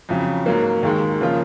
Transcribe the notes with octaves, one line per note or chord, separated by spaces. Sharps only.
F2 C#3 F#3
G#2 F#3 A#3
D#2 D#3 G#3
C#3 F3 A#3 F4